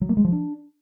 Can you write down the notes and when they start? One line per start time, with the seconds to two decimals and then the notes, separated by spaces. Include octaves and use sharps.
0.01 F#3
0.09 A#3
0.17 G#3
0.25 F3
0.32 D4